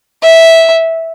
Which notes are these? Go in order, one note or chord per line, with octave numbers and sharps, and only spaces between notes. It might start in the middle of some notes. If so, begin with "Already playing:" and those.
E5